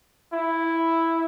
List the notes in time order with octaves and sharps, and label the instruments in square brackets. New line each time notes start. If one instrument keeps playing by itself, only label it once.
[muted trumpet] E4